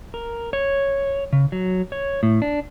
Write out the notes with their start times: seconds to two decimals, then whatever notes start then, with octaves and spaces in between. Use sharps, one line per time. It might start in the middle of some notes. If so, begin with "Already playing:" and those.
0.14 A#4
0.53 C#5
1.33 C#3
1.52 F#3
1.92 C#5
2.23 A2
2.42 D4